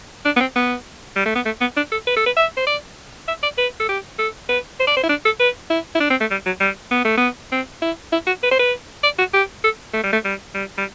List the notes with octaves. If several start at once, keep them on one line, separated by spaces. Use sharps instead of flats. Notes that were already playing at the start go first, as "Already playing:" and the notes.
D4
B3
C4
B3
G3
A3
B3
A3
B3
D4
A4
B4
A4
B4
E5
C5
D5
E5
D5
B4
A4
G4
A4
B4
C5
D5
C5
E4
D4
A4
B4
E4
E4
D4
C4
A3
G3
F#3
G3
B3
A3
B3
C4
E4
E4
F#4
B4
C5
B4
D5
F#4
G4
A4
A3
G3
A3
G3
G3
G3